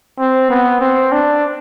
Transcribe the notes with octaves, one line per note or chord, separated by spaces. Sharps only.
C4
B3
C4
D4